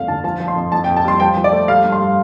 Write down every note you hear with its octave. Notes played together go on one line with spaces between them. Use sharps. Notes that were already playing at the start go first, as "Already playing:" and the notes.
Already playing: G1 F2 A3 F5
D3 A5
F3 A5
F3
C6
F2
F2 A5
G5
F2
A5
G3 C6
F3 G5
F3
D5
A3
G3 F5
G2
C6
G3